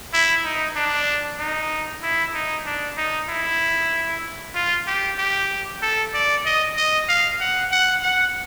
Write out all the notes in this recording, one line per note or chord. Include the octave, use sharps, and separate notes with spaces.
E4
D#4
D4
D#4
E4
D#4
D4
D#4
E4
F4
G4
G4
A4
D5
D#5
D#5
F5
F#5
F#5
F#5